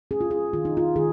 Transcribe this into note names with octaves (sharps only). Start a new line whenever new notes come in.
C#4 G#4
F4
G#4
D#3 F4
D#4
F4
D#3 G#4